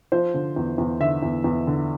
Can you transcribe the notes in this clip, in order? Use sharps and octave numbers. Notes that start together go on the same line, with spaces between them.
F3 C5
D3
E2
E2
D3 E5
E2
E2
D3